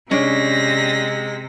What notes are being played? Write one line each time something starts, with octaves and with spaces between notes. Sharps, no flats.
C3 G#3 C#4 D4 A#6 B6